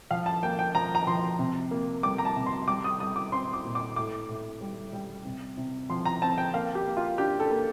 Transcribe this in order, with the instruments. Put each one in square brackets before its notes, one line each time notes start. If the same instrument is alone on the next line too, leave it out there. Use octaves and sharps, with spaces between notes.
[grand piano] F3 F5
A5
A#3 G5
G5
F3 A#5
A#5
F3 C6
C3
A#3
G3 D6
A#5
A5
C3
C6
G3 D6
D#6
G3 D#6
D6
C4 C6
D6
A#2
D6
A2 D6
A2
G3
G3
C3
C3
F3 C6
A#5
C4 A5
G5
A#3 F5
G4
A#3
F4
D4 G4
A4
A#3